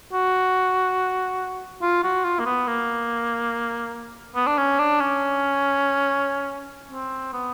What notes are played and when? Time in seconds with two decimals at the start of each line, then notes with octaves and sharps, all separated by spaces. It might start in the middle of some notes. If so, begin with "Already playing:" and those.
0.13 F#4
1.82 F4
2.04 F#4
2.24 F4
2.39 A#3
2.46 B3
2.67 A#3
4.36 B3
4.47 D4
4.58 C#4
4.79 D4
5.00 C#4
6.91 C4
7.33 B3